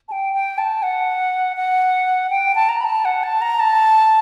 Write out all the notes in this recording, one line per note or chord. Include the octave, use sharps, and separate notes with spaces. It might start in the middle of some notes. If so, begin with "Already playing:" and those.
A5
G5
G5
A5
F#5
F#5
G5
A5
A#5
B5
A5
F#5
A5
A#5
A5